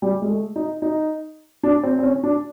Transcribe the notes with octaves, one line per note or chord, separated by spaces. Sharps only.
G3
G#3
A3
D#4
D#4
D4
C4
C4
C#4
D4